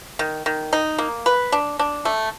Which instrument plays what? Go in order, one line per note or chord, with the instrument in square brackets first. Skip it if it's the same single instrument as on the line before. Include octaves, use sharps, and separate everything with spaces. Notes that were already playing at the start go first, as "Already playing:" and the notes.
[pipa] D#3
D#3
D#4
A#3
B4
D4
D4
A3